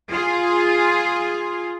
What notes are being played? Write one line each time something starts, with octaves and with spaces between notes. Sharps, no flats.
F4 G#4